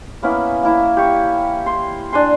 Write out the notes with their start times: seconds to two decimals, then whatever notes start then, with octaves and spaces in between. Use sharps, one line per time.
0.23 A#3 B3 C#4 E4
0.63 A#3 E4
0.97 G4 C#6
1.66 C6
2.13 D4 G#5 C6